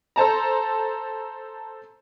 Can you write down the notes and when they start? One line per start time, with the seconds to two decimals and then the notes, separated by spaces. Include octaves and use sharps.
0.16 A4 C5 A5 A#5